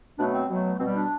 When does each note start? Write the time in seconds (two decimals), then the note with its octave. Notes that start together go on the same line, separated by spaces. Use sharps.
0.19 B2 F#3 A3 D4
0.33 C4
0.49 B2 F#3 A3
0.79 B2 G3 C4
0.95 D4